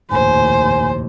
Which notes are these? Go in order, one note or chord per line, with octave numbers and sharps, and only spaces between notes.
F1 A#1 D#2 A2 C5 G#5